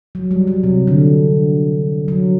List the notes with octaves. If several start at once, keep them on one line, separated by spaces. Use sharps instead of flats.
F#3
G3
F#3
C3
D3
F#3